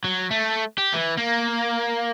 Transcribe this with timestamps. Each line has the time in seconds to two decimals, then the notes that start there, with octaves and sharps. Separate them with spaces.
0.04 F#3
0.31 A3
0.78 G4
0.94 E3
1.18 A#3